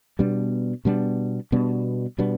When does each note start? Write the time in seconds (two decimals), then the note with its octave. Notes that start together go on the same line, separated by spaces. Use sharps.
0.19 B2 G3 B3 D4
0.85 B2 G3 B3 D4
1.52 B2 G3 B3 D4
2.18 B2 G3 B3 D4